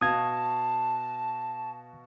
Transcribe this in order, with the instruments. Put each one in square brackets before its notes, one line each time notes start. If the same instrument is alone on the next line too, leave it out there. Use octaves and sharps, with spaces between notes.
[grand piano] B2 F#4 F5 [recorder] A5 [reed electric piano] D#6 G#6